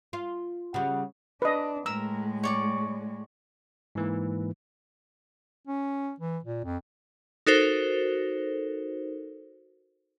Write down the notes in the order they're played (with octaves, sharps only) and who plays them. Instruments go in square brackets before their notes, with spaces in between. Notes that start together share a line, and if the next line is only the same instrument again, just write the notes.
[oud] F4
[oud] C#3 G3 [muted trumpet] F#5
[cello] D4 [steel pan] B4 D#5
[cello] A2 G#3 [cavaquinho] A#4 [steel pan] E6
[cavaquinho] C#5 D5 C#6
[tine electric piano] G#2 E3 A#3
[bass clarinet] C#4
E3
A#2
F2
[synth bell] D#4 F#4 A4 A#4 C5